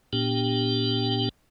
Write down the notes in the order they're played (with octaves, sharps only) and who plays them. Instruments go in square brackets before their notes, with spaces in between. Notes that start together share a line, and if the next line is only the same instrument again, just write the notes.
[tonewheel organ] A#2 B3 D4 G4 G5